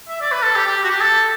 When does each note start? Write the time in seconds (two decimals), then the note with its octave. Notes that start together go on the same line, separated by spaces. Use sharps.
0.09 E5
0.21 D5
0.32 B4
0.43 A4
0.55 G4
0.67 G4
0.84 F#4
0.90 G4
1.01 A4